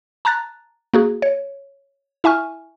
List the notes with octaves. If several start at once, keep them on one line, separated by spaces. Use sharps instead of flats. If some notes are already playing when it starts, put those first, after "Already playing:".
A5 A#5 F#6 A6
A#3 F#4 G#4
C#5
E4 E5 G#5 C#6 F6